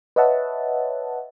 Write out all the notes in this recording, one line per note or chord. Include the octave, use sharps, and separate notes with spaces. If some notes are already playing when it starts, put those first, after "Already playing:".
B4 C#5 D#5 E5 F#5 A5